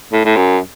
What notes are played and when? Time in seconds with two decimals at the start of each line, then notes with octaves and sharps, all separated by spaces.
0.13 A2
0.25 A2
0.37 F#2